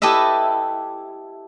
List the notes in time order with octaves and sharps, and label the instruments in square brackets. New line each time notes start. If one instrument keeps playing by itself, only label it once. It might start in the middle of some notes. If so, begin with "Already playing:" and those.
[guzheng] E4 G4 A4 B4 D#5 E5